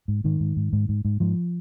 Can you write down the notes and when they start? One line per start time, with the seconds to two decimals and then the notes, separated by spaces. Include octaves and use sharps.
0.08 G#2
0.24 G#2 D#3
0.40 G#2
0.57 G#2
0.73 G#2
0.89 G#2
1.05 G#2
1.20 G#2 F3